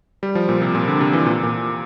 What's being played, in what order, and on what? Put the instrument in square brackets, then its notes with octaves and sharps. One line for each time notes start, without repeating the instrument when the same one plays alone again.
[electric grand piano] G3
F3
A#2
C3
A#2
D3
C3
E3
A#2
A#2